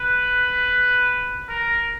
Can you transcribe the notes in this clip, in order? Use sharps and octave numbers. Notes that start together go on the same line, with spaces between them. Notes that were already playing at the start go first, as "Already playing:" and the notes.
Already playing: B4
A#4